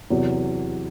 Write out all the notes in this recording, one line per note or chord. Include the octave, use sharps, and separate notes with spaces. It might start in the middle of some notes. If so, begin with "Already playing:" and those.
E2 C3 F#3